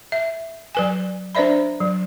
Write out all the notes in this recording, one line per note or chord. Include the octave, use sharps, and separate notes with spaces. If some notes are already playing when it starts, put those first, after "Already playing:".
E5
F#3 B4 G#5
D4 B4 C5 D5 E5 B5
F#3